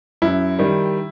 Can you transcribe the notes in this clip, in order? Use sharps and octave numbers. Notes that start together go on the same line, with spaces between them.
F#2 E4
D#3 G3